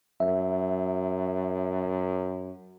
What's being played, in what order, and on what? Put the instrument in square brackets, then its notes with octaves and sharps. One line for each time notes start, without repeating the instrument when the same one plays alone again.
[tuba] F#2 [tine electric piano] E5